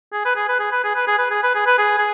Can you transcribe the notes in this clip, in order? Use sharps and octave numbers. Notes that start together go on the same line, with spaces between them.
G#4
B4
G#4
B4
G#4
B4
G#4
B4
G#4
B4
G#4
B4
G#4
B4
G#4
G#4